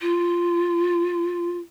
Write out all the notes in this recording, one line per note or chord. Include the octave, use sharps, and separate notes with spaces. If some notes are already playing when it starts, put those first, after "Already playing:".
F4